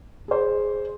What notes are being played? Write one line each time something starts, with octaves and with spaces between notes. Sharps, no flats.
G#4 C5